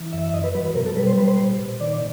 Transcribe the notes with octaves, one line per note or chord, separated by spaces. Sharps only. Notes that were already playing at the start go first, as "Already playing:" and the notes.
Already playing: E3
F#2 E5
E5
F#2 D#5
B4
F#3 B4
B4
B2 A#4
A4
G3 B4
C5
G3 B4
C5
A#2
A#2
D#3 D5